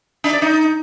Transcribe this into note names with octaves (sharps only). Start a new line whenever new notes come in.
D4
D5
D#4